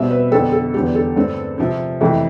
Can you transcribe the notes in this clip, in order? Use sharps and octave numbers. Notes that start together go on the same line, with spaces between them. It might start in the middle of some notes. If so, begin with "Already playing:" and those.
Already playing: B2 G3 C4 E5
B4
F2 D3 F3 B3 A4
A4
E2 D3 G3 G4
A4
G2 D3 A3 C4
C3 F3 C4
F2 C3 E3 A3